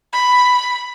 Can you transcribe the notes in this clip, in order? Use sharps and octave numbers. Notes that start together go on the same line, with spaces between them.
B5